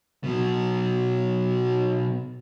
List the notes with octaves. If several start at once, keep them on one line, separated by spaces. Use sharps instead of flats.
B2 F#3